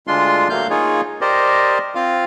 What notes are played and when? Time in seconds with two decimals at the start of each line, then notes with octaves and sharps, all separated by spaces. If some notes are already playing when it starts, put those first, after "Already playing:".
0.07 D2 G#3 D4 F4 C6
0.50 D2 F#3 A3 A#3 F5 G6
0.70 A#3 D#4 F4 G#4 C#5
1.21 G4 A#4 C5 D5 D#5
1.95 C4 F4 F5